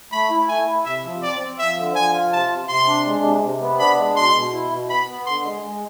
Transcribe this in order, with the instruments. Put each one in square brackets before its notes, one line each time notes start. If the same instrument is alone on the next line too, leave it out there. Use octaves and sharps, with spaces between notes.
[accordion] A3 [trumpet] B5
[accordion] E4
[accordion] A3 [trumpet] G#5
[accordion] E4
[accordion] C3 [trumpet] E5
[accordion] F3
[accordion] C4 [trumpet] D5
[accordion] C4
[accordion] F3 [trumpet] E5
[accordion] D3
[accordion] F3 [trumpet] G#5
[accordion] F4
[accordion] C3 [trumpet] A5
[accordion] C3
[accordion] C3 [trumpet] C6
[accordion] D4
G#3
C3
C3
B3
[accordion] D4 [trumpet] B5
[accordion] G#3
[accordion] B2 [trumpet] C6
[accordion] B2
E4
B2
[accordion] B3 [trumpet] B5
[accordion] B3
[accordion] D3 [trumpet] C6
[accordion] G#3
G#3